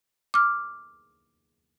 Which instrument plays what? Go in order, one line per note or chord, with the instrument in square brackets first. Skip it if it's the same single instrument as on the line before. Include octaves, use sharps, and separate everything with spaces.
[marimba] D6 F6